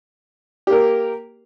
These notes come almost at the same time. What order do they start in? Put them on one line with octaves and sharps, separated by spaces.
G4 A#3 A#4